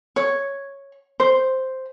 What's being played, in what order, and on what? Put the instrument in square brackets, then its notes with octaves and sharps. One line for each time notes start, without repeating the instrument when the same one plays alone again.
[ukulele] C#5
C5